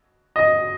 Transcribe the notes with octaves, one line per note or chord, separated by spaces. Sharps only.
D#5